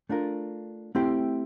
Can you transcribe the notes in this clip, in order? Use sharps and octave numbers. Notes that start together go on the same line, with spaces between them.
A3 D4 F4 A#4
A3 C4 E4 G4 C5